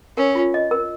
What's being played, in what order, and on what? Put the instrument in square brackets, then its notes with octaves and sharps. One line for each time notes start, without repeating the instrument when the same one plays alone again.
[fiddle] C#4 [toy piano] A#4
[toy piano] F4
D#5
A#4